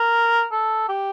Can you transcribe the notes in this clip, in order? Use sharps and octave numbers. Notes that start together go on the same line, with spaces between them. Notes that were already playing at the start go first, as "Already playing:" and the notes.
Already playing: A#4
A4
G4